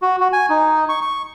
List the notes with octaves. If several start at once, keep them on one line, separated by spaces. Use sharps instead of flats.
F#4
F#4
G#5
D#4
C#6
C#6